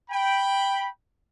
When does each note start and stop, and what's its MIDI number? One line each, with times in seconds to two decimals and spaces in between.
0.10 0.87 79
0.10 0.87 83